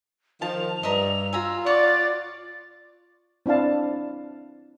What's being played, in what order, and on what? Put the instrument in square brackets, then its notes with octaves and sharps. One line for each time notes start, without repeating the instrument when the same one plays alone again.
[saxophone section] D#3 F3 [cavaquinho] A5 [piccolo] F7
[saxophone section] G2 [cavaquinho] D#5 E5 A#5
[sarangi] F4 [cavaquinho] G#5 A#5 [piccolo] E6
[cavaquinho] C#5 F#5 [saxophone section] D5 [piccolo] A6
[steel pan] C4 D4 E4 F5 A5